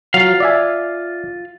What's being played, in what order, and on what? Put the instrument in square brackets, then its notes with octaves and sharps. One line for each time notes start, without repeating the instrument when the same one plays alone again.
[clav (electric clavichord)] F#3 [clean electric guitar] F4 F5
[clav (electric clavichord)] D5 E5 G#5